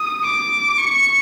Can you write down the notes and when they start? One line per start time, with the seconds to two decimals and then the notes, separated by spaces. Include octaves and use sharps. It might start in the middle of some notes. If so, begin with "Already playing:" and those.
Already playing: D#6
0.24 D6
0.79 C#6